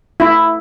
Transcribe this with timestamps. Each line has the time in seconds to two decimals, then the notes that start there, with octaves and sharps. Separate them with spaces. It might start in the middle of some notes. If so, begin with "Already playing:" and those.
0.20 E4